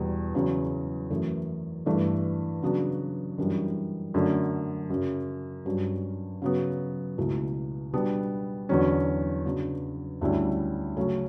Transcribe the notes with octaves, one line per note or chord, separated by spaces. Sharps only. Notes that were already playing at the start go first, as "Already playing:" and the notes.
Already playing: E2 B2 G3
E2 C#3 F#3 C#4
F#2 E3 A3 E4
G2 E3 A3
C#3 F#3 B3 D4
F#2 E3 G3 D4
F#2 D3 A3
F#2 C#3 F#3
G2 F#3 C#4
C#3 F#3 B3
C#2 B2 A3 E4
B2 G3 B3 D4
E2 D3 F#3 C#4
C#3 F#3 B3 D4
D2 D3 G3 C#4 E4
C#3 F#3 A3 C#4